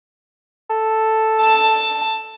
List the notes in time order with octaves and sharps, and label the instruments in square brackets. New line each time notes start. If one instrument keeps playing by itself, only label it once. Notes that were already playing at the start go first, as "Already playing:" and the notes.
[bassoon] A4
[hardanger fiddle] A5